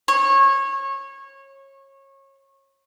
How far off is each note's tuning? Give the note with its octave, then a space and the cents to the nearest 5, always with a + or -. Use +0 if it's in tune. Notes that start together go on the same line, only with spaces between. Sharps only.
C#5 -25